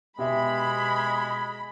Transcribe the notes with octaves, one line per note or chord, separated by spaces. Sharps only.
B2 G#3 G4 E5 B5